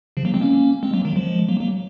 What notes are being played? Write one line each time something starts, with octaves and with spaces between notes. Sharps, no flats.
C#3 F3
F#3 A#3
G#3 C4
A#3 C#4
G#3 C4
F#3 A#3
D#3 F#3
F3 G#3
F#3 A#3
F#3 A#3